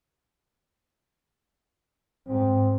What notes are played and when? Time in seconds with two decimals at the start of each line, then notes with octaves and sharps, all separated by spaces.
2.29 G#2 C4